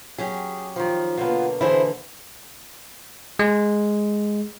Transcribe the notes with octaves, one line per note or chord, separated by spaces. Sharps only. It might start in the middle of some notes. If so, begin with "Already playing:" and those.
F#3 C#4 G4 G#4
D#3 F3
B2 D3 A#3 B3 F4
D3 E3 E4 G#4 C5
G#3